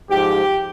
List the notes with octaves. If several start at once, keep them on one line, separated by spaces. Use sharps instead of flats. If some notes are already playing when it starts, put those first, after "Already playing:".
G#2 F3 G4